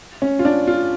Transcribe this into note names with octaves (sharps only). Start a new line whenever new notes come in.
C#4
F4
D4
F4